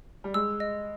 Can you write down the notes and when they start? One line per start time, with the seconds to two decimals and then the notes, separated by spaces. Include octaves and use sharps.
0.24 G3
0.34 G#3 E6
0.60 D#5